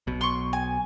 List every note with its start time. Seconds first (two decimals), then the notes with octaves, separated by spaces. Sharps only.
0.07 B1 B2
0.21 C6 C#6
0.53 G#5